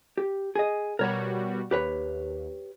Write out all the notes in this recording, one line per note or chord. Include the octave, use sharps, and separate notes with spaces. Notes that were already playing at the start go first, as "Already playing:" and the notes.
G4
G#4 D#5
B2 G3 F#4 A#4 C#5 B5
D#2 G4 B4 C#5